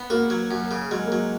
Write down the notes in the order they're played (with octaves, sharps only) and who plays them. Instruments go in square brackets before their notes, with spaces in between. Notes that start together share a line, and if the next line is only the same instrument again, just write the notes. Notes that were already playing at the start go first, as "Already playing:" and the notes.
Already playing: [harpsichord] B3
[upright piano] A#3 [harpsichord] F#4
[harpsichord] F#3
F#2
C#3
[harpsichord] F#3 [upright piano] G#3
[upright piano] A#3
[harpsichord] F#3